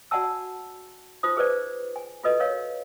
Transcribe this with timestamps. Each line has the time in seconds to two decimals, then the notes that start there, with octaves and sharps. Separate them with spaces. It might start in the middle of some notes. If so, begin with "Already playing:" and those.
0.11 F#4 D5 F#5 G#5 A5 E6
1.23 D#4 F4 C5 D#6
1.37 G#4 B4 C5 D5
1.96 G#5
2.23 F4 F#4 A4 B4 D#5
2.40 A#4 C#5 F5